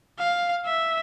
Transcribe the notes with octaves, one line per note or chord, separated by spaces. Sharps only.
F5
E5